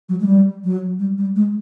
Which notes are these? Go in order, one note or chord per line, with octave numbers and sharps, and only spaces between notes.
F#3
G#3
G3
F#3
G3
G3
G#3